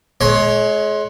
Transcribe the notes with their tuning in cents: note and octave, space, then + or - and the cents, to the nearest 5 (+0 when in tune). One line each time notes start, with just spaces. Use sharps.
G#3 +30 C#5 +0